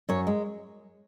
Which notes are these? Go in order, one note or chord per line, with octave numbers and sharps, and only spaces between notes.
F#2 C#5
G#3